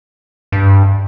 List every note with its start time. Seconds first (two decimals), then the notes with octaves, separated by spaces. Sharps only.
0.52 G2